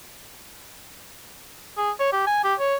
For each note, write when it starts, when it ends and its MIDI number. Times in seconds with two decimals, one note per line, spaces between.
1.78 1.91 68
2.00 2.11 73
2.13 2.24 67
2.27 2.41 80
2.44 2.54 67
2.60 2.76 73